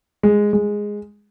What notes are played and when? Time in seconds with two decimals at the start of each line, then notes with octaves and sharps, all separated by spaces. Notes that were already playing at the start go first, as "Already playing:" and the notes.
0.23 G#3
0.53 G#3